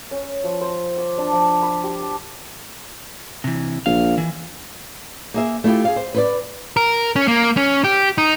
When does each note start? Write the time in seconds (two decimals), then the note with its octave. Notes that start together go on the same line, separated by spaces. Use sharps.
0.11 C#4
0.44 F3
0.61 C5
0.98 D6
1.18 D4
1.32 F3
1.62 B5
1.84 G4
2.01 A5
3.44 C3 E3
3.86 A#1 F5
4.18 E3
5.34 A#3 G#4 E5
5.64 A3 E4 F4 G4
5.85 G#4 F5
5.96 C5
6.14 B4 C5 D5
6.77 A#4
7.16 C#4
7.28 A#3
7.57 C#4
7.84 G4
8.18 D#4